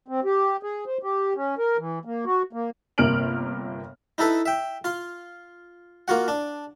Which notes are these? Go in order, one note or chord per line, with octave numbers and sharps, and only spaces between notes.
C4
G4
G#4
C5
G4
C#4
A#4
E3
A#3
F#4
A#3
G1 C3 A#3 F6 D7 F#7
D#4 E4 A4 B4
E5 G5
F4 C6
A#3 F4 F#4 F#5
D4